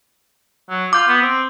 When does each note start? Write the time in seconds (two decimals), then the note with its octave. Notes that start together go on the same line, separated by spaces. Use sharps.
0.70 F#3
0.93 F4 D6 G6
1.08 B3
1.22 C4